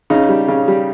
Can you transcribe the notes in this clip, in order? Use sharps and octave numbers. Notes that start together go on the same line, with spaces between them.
C#3 D#4
G3
C#3
G3